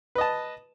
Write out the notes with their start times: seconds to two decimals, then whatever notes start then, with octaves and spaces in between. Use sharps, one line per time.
0.15 B4
0.18 D#5
0.21 A5